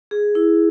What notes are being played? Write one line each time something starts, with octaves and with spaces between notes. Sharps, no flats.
G#4
E4